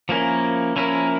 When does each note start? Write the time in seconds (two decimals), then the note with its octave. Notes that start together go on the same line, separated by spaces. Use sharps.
0.09 F3 A#3 C#4 E4 A#4
0.76 F3 A#3 C#4 E4 A#4